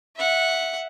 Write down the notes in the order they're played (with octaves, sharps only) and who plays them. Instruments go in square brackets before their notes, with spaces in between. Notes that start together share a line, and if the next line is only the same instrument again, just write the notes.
[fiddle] E5 F#5